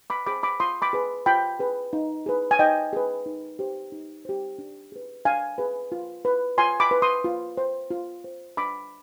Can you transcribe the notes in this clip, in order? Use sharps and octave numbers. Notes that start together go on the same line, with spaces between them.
B5 D6
G#4 C5 B5 D6
B5 D6
F4 C6 D#6
B5 D6
G#4 B4
F4 G5 B5
G#4 B4
D#4
G#4 B4
G#5
D#4 D#5 G5
G#4 B4
D#4
G4 C5
D#4
G4 C5
D4
G#4 B4
D4 F5 G#5
G#4 B4
F4
B4
F4 G#5 C6
B5 D6
B4
C6 D#6
F4
C5
F4
C5
D4 B5 D6